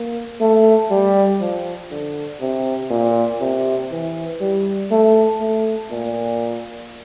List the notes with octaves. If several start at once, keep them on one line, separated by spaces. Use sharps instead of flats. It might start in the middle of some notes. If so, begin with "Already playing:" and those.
Already playing: A#3
A3
G3
F3
D3
C3
A#2
C3
E3
G3
A3
A3
A#2